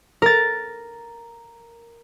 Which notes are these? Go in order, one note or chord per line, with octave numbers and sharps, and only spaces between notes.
A#4 A6